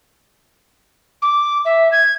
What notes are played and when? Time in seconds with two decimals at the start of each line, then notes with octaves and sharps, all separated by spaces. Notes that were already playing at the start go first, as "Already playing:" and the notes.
1.22 D6
1.65 E5
1.92 G#6